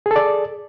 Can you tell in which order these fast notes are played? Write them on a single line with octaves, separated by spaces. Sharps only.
G#4 A4 D5